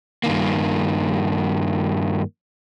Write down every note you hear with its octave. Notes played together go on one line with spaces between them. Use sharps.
G2 D#3 A#3